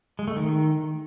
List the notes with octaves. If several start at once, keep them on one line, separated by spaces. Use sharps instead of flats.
G#3
A3
D#3